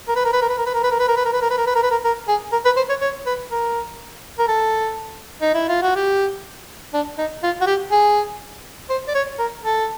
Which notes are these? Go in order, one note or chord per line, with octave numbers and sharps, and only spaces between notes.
A#4
B4
A#4
B4
A#4
B4
A#4
B4
A#4
B4
A#4
B4
A#4
B4
A#4
B4
A#4
B4
A#4
B4
A#4
B4
A#4
A#4
G#4
A#4
B4
C5
C#5
C#5
B4
A#4
A#4
A4
D#4
E4
F4
F#4
G4
D4
D#4
F4
F#4
G4
G#4
C5
D5
C#5
A#4
A4